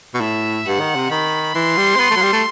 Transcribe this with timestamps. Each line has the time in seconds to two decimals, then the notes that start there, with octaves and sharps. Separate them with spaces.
0.14 B2
0.21 A2 E5
0.66 G2 F#5
0.80 D#3
0.95 C3
1.11 D#3 B5
1.54 E3 C6
1.77 G3
1.96 C4
2.00 B3
2.11 A3
2.16 F#3
2.22 G3
2.33 A3